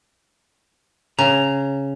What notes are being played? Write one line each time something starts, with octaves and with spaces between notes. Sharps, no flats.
C#3 A#5